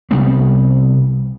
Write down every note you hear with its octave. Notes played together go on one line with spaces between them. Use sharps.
C2 C3 G3 B3